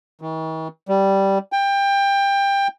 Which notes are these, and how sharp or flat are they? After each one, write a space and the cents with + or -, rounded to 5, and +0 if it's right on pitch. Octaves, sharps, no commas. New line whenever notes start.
D#3 +45
G3 -10
G5 +20